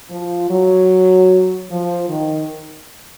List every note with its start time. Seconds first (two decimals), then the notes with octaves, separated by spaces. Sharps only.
0.10 F3
0.50 F#3
1.70 F3
2.09 D#3